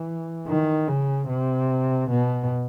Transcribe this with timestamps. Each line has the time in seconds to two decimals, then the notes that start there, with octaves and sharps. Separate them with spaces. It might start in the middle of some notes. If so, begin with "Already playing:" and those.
Already playing: E3
0.47 D#3
0.88 C#3
1.28 C3
2.10 B2